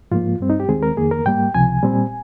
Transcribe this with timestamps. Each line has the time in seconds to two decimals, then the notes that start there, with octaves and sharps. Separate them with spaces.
0.11 G#2 F3 A#3 F4
0.40 G2 G3 C4
0.50 D#4
0.60 G4
0.68 D#2 D#3 G#3 C4 G#4
0.83 A#4
0.97 F2 D#3 A#3 G#4
1.11 A#4
1.25 G#2 G3 A#3 G5
1.54 C#2 C3 F3 G#5
1.83 A#2 G3 C4